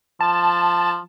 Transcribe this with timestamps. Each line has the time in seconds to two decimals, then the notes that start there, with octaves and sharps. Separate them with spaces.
0.21 F3 A5